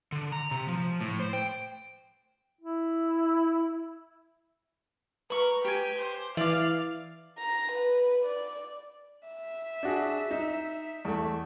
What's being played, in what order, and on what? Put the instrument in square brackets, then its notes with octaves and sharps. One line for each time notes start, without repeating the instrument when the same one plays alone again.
[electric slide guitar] D3
A#5
C3
F3
A2
C5
G5
[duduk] E4
[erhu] A#4 [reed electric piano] B4 [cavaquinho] B5 C#6
[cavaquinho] G4 G#5 [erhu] G5
[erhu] C5
[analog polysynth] E3 [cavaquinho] D5 D6 [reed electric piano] E5 [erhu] F5
[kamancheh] A#5
B4
D5
[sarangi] E5
[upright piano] D4 F#4 G#4
D#4
E2 A3